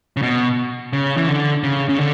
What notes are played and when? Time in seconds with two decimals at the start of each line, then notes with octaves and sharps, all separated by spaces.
0.17 C#3
0.22 B2
0.93 C#3
1.17 E3
1.28 D3
1.63 C#3
1.89 C#3
1.98 D3